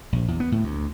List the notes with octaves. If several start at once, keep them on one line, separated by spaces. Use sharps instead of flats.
A#1
E2
B3
A2
D2